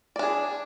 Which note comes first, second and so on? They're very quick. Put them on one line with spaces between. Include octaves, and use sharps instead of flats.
D5 D4 G#4